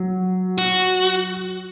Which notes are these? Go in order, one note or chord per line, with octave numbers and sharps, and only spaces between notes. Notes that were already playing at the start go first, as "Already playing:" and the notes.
Already playing: F#3
F#4